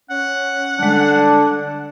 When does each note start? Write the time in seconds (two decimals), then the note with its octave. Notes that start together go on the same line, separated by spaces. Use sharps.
0.10 C#4 F#5
0.79 D3 G3 G#3 D4